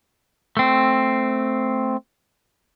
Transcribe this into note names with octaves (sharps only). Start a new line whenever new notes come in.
A3 C4